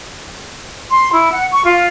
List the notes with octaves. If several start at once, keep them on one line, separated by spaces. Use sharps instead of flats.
C6
E4
F#5
C#6
F4